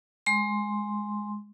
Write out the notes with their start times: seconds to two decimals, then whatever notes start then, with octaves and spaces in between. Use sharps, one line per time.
0.26 G#3 C6